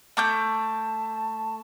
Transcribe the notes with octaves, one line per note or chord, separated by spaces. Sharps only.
A3 A5 D6 G6